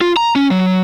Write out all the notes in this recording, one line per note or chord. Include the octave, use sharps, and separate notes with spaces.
F4
A#5
C#4
F#3